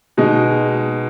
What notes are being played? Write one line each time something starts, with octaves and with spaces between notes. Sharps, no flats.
B2 G#3 D#4